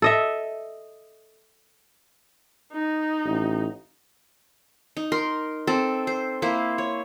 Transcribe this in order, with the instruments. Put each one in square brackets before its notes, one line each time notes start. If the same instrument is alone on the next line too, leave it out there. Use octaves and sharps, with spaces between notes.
[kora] A4 D#5 E5
[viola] D#4
[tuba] A1
[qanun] D#4
A#4 C6
C4 A4
C5
A#3 E4 C5
C#5